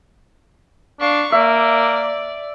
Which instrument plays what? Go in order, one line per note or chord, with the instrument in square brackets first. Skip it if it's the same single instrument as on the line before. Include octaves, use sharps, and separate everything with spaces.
[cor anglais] D4 [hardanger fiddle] F5 C#6
[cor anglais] A#3 [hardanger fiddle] D5 [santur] E5